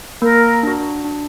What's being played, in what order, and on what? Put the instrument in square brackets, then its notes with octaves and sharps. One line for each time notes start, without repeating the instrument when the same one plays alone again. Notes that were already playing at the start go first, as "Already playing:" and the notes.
[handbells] A#3 [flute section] A#4
[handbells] D4 F#4
D4